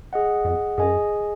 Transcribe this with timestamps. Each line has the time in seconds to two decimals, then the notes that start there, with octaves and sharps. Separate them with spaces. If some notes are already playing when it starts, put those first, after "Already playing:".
0.13 G#4 D#5 F#5
0.45 F2
0.78 F#2 G#4 D#5 G#5